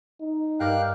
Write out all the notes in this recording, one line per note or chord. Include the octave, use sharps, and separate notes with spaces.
D#4
G2 A#4 F5 G5 D6 F#6